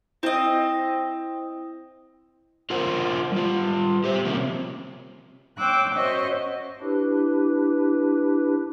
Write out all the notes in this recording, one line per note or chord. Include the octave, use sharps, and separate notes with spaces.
C4 E4 D#5
F4 A#4 C5 F#5
G3 F4
G4 C5 E5
C3 F3 A#3 C4 C#4
C#5 G5 C6 D6 E6 F#6
C#4 F#4 C5 C#5 D#5 E5
D4 E4 G4 B4